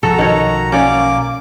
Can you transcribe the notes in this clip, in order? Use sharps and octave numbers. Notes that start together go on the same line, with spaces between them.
B1 F3 F#4 A4 A#5
D#3 C#5
A#3 C#4 D5 D6